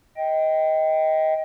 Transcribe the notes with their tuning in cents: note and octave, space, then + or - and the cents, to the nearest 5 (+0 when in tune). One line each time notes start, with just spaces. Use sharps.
D#5 +20 G5 +0